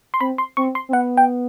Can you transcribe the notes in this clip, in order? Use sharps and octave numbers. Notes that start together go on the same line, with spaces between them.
C6
C4 B5
C6
C4 C#6
C6
C4
B3 F#5
G5